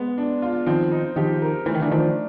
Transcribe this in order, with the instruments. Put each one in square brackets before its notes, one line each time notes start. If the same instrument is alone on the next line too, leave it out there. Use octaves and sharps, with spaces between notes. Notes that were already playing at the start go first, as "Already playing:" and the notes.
Already playing: [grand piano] G#3 B3
D4
F4
[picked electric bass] D#3 F3 [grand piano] C4
[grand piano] D#4
[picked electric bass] D#3 F3 [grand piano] G4
[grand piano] A#4
[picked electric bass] E3 [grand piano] A3
[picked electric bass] D#3
D3 E3
[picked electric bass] D#3 F3 [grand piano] D4